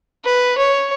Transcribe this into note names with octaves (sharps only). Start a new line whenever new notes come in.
B4
C#5